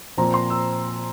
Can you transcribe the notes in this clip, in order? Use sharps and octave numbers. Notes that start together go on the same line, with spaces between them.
A#2 F3 C4 A#5
C6
E6